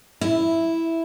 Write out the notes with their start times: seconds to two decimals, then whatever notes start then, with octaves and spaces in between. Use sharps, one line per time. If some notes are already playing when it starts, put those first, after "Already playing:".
0.21 E4